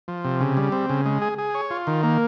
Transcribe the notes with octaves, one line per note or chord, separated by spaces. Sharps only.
F3
C3
C#3
G3
C4
C#3
G#3
G#4
G#4
C#5
F4
D#3
A#3